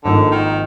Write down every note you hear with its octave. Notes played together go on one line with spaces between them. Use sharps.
G#1 G#2 D3 F3 A#3 D#4
D#3